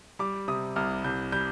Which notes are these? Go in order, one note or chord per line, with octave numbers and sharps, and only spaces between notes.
G3 D6
C3 D#6
C2 F6
C2 G6
G3 G6